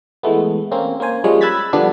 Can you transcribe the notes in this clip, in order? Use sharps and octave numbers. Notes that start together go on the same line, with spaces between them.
E3 G#3 A3 B3
A#3 C4 C#4
A#3 C#4 C5 G#5
F3 G3 G#3 C#4 C#5
B5 E6 F#6 G#6 A6 B6
D3 F3 G3 B3 D4